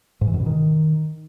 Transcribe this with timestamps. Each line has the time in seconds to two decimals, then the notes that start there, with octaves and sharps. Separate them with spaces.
0.21 G#2
0.27 E3
0.34 F#2
0.40 B2
0.46 D#3